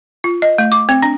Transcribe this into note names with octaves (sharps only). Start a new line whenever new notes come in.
F4
D#5
A3
D6
C4
D4